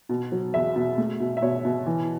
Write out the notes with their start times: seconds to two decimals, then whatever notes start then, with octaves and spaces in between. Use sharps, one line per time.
0.09 B2
0.32 F#3
0.54 E2 E5
0.76 B2
0.98 A3
1.20 B2
1.37 E5
1.42 B2 C#5
1.65 B2
1.86 E3